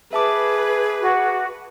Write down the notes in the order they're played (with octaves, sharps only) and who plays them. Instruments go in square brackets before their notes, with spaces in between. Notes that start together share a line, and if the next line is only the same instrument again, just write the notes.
[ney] G#4 [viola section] B4 [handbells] E5 A5 D6
[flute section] F#4